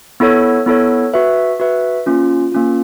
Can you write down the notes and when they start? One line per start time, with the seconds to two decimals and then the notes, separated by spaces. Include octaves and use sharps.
0.20 B3 E4 A4 C#5
0.66 B3 E4 A4 C#5
1.14 F#4 B4 E5
1.60 F#4 B4 E5
2.06 A#3 C#4 F4
2.52 A#3 C#4 F4